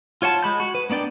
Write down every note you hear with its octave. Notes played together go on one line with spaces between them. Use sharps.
F4 C#5 F#5 A5
G#3 B5 G6
F#4
B4
A#3 B3 D4 D5 G5